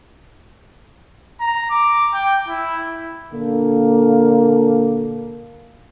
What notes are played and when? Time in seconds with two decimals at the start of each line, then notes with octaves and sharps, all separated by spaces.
1.40 A#5
1.70 D6
2.14 G5
2.48 E4
3.33 A#2 D3 A#3